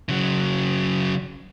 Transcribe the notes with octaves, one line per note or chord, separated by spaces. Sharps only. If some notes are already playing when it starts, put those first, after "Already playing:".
C#3 F#3